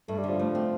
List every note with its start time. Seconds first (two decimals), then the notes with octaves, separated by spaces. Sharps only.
0.08 G2 A3
0.18 G3
0.24 D3
0.29 F3
0.39 A3
0.55 C4